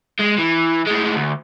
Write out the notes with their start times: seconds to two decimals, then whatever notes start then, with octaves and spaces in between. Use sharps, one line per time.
0.20 G#3
0.39 E3
0.87 A2 G#3
1.16 D2